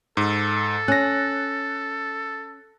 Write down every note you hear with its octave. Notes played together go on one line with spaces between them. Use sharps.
G#2 A4
C#4 F#6 A#6